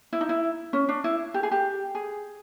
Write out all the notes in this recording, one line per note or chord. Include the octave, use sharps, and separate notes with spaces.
E4
D#4
E4
C#4
D4
E4
G4
G#4
G4
G#4